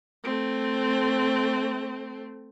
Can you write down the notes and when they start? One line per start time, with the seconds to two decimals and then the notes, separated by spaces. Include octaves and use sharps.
0.24 A3 C4